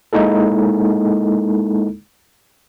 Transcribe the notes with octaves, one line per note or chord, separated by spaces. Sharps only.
G#3 A#3 D#4 E4 A4